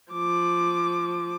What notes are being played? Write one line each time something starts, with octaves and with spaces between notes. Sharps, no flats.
F3 D6